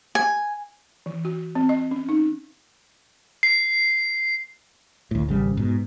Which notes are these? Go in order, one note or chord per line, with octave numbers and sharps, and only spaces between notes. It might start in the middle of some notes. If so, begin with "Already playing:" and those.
G#5
E3
F#4
C4
D#5
C#4
D#4
C7
D2 A2
G#1 C#3 G3
G#2 B2